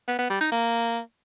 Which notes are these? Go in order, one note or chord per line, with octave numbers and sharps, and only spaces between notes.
B3
B3
G3
D#4
A#3